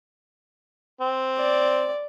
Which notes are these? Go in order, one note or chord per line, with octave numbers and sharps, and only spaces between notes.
C4
D5